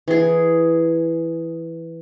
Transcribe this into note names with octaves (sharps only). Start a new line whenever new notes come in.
E3 G#4